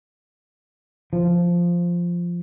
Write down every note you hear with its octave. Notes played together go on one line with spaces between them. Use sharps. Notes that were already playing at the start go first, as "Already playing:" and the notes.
F3